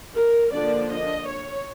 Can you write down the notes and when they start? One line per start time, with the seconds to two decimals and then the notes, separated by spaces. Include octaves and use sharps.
0.15 A#4
0.53 D3 F3 A#3 D4 D5
0.91 D#5
1.27 C#5